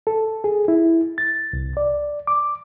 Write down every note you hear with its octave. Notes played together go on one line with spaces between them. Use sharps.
A4
G#4
E4
A6
C2
D5
D6